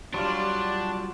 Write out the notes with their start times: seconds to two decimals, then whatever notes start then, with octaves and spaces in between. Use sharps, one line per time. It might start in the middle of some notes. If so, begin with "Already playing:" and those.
0.14 F#3 G3 D4 F4 G4 D5 C6